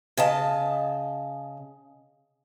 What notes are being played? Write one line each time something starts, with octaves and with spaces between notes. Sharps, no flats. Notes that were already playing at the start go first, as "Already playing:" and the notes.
C#3 D#5 A5